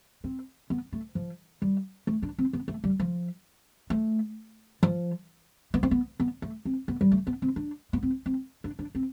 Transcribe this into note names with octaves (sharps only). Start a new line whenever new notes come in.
C4
B3
A3
F3
G3
A3
D4
C4
B3
A3
G3
F3
A3
F3
B3
C4
B3
B3
A3
C4
B3
G3
A3
B3
C4
D4
B3
C4
C4
D4
D4
C4